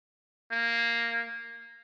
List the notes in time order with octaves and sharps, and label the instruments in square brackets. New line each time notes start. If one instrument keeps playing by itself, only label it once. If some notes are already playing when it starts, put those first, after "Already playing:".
[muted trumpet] A#3